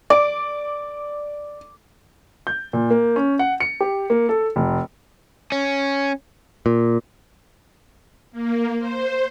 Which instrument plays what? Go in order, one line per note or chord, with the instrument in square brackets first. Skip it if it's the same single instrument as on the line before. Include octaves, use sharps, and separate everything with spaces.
[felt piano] D5 [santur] D6
[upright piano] G6
A#2
A#3
C#4
F#5
C#7
G4
A#3
A4
F1
[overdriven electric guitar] C#4
[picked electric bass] A#2
[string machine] A#3
C5